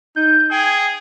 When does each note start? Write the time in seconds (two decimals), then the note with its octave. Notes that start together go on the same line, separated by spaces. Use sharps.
0.16 D#4 G6
0.51 G#4 G5 G#6